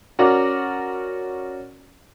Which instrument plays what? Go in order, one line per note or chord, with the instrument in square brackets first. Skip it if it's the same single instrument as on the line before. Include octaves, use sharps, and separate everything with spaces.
[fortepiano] C#4 F#4 A#4 D5